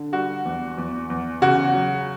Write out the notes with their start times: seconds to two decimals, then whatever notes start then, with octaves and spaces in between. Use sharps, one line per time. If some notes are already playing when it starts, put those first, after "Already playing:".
Already playing: D3
0.12 G3 F#4
0.45 E2
0.78 E2
1.10 E2
1.42 C#3 F#4
1.74 F#3